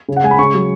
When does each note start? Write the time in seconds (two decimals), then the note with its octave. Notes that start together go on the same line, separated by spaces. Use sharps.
0.08 C#3
0.16 F#5
0.24 G#3 G#5
0.31 B5
0.39 C#3 C#6
0.54 F#3